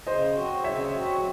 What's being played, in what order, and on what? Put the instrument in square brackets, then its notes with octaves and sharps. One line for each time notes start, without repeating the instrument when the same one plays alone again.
[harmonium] C#3 [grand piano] C5 D#5
[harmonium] F#3 C4 F#4
[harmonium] C#3 [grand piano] C#5 E5
[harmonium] F#3 C4 F#4